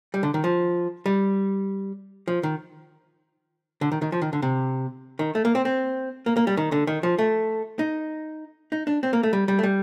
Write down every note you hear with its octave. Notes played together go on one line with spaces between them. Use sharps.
G3
D3
D#3
F3
G3
F3
D#3
D3
D#3
D#3
F3
D#3
D3
C3
D#3
A3
A#3
C4
C4
A#3
A#3
G3
D#3
D3
D#3
F3
A3
D#4
D#4
D4
C4
A#3
A3
G3
G3
A3
G3